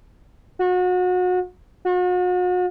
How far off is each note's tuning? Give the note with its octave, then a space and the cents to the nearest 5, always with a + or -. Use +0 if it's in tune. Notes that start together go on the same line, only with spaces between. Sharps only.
F#4 -30
F#4 -40